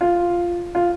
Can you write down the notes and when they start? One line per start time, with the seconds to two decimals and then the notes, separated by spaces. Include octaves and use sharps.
0.01 F4
0.75 F4